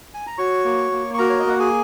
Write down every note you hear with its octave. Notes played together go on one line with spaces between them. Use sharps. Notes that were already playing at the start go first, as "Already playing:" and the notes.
G#5
A#5
F#4 C#5 C#6
A#3
A#3
C#6
F#4 A#4 A#5
C#5
D#5
A#3 F#5
G#4 G#5